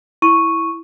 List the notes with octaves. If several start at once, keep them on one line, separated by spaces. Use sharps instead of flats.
E4 C#6 D#7